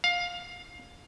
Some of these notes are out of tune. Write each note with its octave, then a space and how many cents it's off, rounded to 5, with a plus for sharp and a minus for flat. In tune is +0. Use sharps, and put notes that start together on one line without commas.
F5 +15